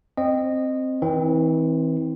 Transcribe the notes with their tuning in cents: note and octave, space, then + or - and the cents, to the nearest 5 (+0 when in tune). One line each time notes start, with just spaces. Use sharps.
C4 +0 D#5 -20
E3 -40 C4 +0